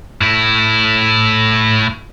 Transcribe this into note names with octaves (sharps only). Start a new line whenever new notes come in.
A2 E4